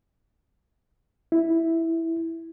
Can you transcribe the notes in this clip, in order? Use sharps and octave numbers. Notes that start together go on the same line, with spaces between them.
E4